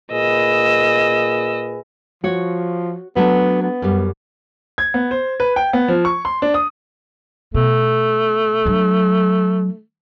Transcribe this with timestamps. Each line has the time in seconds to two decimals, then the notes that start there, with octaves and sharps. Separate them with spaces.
0.12 A#2 G#4 B4 D#5 E6
2.24 F3 F#4 C#5
3.17 F#3 A3 B3 D4
3.62 B3
3.82 F#2 G3
4.78 G#6
4.94 B3
5.11 C5
5.40 B4
5.56 G5
5.73 B3
5.88 F3
6.05 C#6
6.25 C6
6.42 D4
6.54 D#6
7.54 B2 A3
8.65 F#3 D4